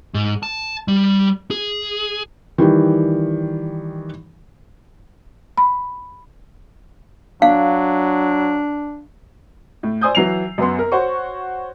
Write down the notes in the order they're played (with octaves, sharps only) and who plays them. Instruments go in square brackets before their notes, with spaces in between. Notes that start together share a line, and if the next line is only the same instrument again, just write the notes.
[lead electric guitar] G#2
A5
G3
G#4
[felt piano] D#3 E3 G3 G4
[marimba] B5
[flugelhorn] F#3 [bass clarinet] D4 [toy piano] F5
[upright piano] A2
C5 D5 G#5 D#6 E6 G6
E3 F#3 C7 F7
F#2 B3 C6
A#4
F#4 C5 C#5 C#6